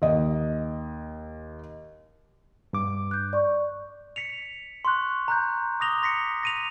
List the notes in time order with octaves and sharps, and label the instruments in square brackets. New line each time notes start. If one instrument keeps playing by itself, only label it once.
[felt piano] D#2 D#5
[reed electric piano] G2 D6
[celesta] F#6 G6
D5 C#6
[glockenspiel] B6 C#7 F7
C6 C#6 F#6
A#5 F#6 G6
D6 D#6 A#6 F7 G7
C6 A#6 B6 C#7
A#6 D#7 F7